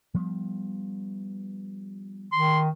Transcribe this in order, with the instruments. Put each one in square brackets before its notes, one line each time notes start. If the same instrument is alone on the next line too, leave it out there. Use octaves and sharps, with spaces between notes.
[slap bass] F3 G3 B3
[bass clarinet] D#3 [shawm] C6